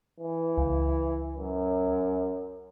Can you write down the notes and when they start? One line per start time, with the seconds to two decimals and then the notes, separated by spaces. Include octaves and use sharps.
0.20 E3
0.57 C#2
1.37 F#2